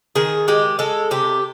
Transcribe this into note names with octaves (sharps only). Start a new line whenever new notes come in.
D#3 G#4
G#3 G4
G#3 A4
C3 G4